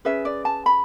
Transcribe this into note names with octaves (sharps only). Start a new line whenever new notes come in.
C#4 G#4 B4 E5
D5
A5
B5